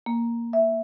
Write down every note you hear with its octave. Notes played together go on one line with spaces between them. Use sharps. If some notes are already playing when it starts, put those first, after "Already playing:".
A#3
E5